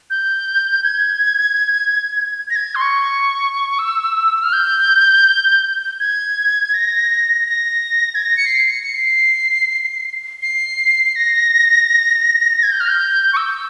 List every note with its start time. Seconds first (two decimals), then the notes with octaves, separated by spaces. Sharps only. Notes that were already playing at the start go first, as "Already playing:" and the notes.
0.10 G6
0.83 G#6
2.50 A#6
2.56 G#6
2.75 C6
2.81 C#6
3.79 E6
4.43 F6
4.53 G6
6.00 G#6
6.74 A#6
7.48 A#6
8.15 G#6
8.21 A#6
8.37 C#7
8.46 C7
8.71 C#7
8.83 C#7
8.95 C7
10.42 C7
11.16 A#6
12.63 G#6
12.72 G6
12.80 F6
12.89 G6
13.33 C#6
13.37 E6